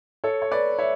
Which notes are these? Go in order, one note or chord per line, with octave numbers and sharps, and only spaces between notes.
A4 C#5
C#5
B4 D5
C#5 E5